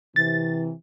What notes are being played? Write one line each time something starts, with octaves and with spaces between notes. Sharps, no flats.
C3 E3 A6